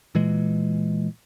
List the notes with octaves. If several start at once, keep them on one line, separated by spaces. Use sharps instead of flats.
A#2 E3 G#3